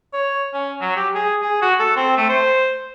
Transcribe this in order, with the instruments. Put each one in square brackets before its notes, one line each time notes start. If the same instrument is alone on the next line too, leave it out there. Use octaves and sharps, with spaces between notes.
[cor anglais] C#5
C#4
F#3
G4
G#4
G#4
F#4
A4
C4
A3
C5